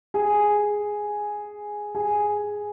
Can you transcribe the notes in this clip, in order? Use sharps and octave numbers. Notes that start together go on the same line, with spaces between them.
G#4 G#5
G#4 G#5